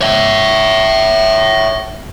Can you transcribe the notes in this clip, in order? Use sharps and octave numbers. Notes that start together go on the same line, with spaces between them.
C#5 E5